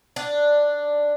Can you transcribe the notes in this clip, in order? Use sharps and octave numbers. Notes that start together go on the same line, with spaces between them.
D4